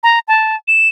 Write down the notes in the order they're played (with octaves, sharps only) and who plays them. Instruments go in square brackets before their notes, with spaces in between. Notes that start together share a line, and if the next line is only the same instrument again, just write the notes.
[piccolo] A#5
A5
E7